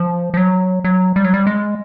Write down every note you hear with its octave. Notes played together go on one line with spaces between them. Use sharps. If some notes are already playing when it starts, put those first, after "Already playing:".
Already playing: F3
F3
F#3
F#3
G3
F#3
G3
G#3